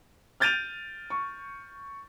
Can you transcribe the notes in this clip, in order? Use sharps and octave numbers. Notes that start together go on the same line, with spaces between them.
F6 G6 A6 D7 D#7 F7
C#6